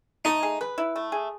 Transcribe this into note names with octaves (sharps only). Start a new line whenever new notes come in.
A3 D#4
G#4
B4
E4
A3
G#4